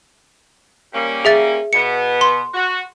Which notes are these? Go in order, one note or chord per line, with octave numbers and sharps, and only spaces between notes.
G3 A#3 C#4
G#4 E5 A6
B2 B3 C#7
C6
F#4